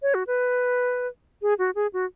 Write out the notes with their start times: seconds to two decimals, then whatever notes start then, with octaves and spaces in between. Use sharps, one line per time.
0.02 C#5
0.14 F#4
0.27 B4
1.42 G#4
1.59 F#4
1.75 G#4
1.93 F#4